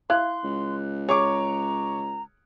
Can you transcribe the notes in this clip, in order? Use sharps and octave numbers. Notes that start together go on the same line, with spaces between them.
E4 F5 C6 F#6
C#2
G#4 C#5 A#5 C#6 D6